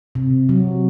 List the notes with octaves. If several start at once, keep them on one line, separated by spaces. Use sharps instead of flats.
C3
F#3